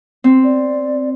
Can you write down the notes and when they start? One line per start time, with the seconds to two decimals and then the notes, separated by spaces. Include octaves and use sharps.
0.24 C4
0.44 D5